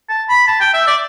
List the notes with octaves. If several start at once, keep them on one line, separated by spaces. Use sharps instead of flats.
A5
B5
A5
G5
E5
D5